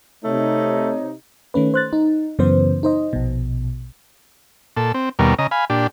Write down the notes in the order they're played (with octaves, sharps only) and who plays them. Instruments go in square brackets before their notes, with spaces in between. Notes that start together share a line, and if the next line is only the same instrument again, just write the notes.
[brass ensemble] C3 D#4 [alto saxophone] A3 [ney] C#5
[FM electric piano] D#3 A3 C#4 B4
C5 F#6 A6
D#4
F#2 C#3 E3 B3 C5
D#4 C5 D#5
A#1 B2
[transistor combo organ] A#2 A4
C4
D#2 B2 G3 A#4
C#3 D#5 A#5
F5 G#5 B5
A#2 D4 G4